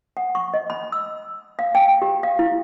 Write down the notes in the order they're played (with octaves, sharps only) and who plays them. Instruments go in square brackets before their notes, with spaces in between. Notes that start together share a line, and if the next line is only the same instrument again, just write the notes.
[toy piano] F#5
C#6
D#5
B5
E6
F5
G5
G4
F5
E4